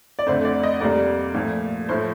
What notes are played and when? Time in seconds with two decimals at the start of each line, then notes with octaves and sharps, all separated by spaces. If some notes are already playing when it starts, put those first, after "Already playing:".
0.19 D5
0.26 F2 D3 A3 C5
0.45 D5
0.63 D#5
0.80 F2 C3 G3 A#3 D5
1.34 A#2 F3 A3
1.89 A2 F3 A3 C5